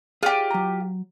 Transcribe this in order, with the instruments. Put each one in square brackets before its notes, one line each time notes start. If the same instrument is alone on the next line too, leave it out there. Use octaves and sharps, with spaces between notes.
[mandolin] F4 G4 [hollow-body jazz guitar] G#4 D5
[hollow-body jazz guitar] F#3 A#5